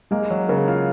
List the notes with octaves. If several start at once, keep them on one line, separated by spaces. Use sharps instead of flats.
G#3 A#3
F#3
C#3 A#3
F4